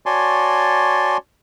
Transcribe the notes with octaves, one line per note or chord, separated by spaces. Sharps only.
F#4 C#5 D5 G#5 A5 C6